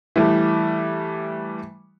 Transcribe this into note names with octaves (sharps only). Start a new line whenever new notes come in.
E3 G3 A3